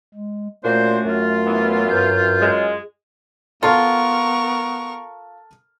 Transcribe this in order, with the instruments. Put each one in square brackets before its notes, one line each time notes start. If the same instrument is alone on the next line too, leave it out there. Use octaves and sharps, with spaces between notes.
[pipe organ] G#3
[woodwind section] A#2 C5 [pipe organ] A3 [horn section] C#4 D4 F#4
[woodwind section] F#2 F4
[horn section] E3 B3
[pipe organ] G2 B4 G6
[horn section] G#3
[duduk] B3 [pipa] F4 [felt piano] A4 A5 F6 [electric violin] A#4 C#6